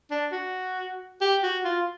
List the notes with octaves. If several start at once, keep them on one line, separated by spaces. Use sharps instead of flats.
D4
F#4
G4
F#4
F4